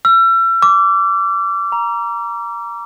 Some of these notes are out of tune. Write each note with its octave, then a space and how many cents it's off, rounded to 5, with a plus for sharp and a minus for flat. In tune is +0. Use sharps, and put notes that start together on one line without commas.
E6 +40
D6 -20
A#5 +15